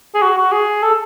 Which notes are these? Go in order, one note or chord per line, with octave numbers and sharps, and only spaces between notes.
G#4
F#4
F#4
G#4
A4